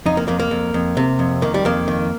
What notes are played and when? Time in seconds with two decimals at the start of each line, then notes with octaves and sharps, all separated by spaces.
0.06 F2 D#4
0.17 A#3
0.28 F2 A#3
0.40 A#3
0.51 F2
0.74 F2
0.97 C3
1.19 F2
1.42 D#3 A#3
1.54 G3
1.65 F2 A#3
1.88 D#3